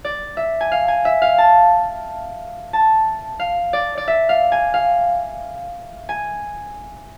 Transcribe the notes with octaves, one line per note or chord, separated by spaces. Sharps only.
D5
E5
G#5
F5
G#5
E5
F5
A5
A5
F5
D5
D5
E5
F5
G#5
F5
G#5